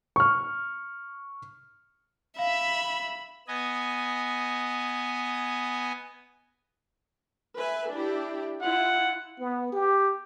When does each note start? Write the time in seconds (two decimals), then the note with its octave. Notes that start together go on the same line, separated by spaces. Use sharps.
0.16 C#6 F6
2.39 E5 F5 B5
3.48 B3 D#5 G#5
7.58 B4 E5 G#5
7.91 D4 E4 G4
8.62 E4 F4 F#5
9.39 B3
9.72 G4